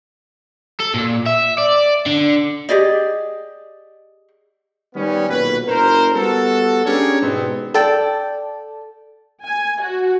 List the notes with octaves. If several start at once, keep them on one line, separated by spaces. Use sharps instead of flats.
A4
A#2
E5
D5
D3
G4 G#4 D5 D#5
D#3 G3 B3 C#4
B1 A#2 F#4 B4
F#1 A#4 C5
G3 B3 F#4 A4
C#4 D4 G4 G#4 A#4 C#5
G#2 B2 D#3 G3 B3 C4
A4 D5 G5
G#5
F#4